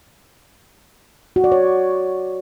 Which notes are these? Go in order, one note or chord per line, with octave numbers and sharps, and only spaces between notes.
F#4
D5
C#5